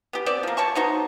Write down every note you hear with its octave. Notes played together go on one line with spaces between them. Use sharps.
B3 G4
B3 C4 D5
F3 A#3
B2 C#5 A5 C#6
B3 D#4 F#4 C5